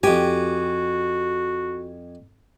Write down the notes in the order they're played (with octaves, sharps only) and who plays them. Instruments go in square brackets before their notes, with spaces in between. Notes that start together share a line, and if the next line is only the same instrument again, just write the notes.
[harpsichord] F2 G#5 [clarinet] F#4 [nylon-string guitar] G4